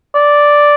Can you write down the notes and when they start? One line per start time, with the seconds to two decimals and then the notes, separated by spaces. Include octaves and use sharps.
0.15 D5